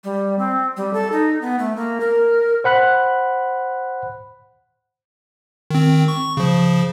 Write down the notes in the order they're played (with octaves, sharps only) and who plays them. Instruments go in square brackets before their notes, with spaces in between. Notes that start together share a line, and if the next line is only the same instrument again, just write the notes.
[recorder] G3
C4
G3
A4
D#4
B3
A3
A#3
A#4
[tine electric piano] C5 F#5 B5 F#6
[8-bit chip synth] D#3 C4
C#6
C#3 F3